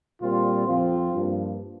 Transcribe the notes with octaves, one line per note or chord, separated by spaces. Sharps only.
A#2 G3 C4 F4
F2 F3 C4 F4
G2 F3 A#3